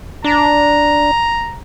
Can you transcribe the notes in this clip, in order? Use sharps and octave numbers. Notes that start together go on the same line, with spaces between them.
D4 A#5